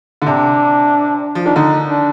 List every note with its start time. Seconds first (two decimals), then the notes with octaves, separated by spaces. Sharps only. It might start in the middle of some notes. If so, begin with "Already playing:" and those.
0.22 D3
0.26 C3 D4
1.35 F3
1.46 D#3 D4
1.56 D3 D#4
1.89 D4